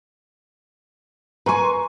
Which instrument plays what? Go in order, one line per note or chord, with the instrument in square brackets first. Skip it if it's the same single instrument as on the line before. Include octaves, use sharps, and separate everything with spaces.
[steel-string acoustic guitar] B4 G#5 [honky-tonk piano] A#5 C6 C#6